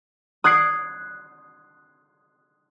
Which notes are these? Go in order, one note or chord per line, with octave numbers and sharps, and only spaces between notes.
D#6 F#6 G#6 C7 D7